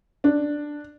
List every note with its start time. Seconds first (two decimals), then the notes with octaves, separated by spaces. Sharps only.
0.24 D4